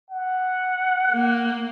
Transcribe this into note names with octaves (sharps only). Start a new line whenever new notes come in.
F#5
A#3